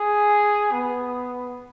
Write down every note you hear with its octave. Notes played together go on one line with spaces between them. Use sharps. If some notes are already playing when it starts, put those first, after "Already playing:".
Already playing: G#4
B3